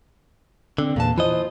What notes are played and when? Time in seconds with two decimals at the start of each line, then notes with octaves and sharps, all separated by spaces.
0.78 D3 C4
0.96 E2 A#2 B4 A5
1.18 E3 F4 C5 D#5